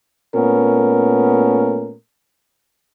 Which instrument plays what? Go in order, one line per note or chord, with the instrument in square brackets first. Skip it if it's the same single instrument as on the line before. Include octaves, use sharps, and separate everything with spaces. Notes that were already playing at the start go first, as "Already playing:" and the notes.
[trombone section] A#2 A3 B3 C#4 A#4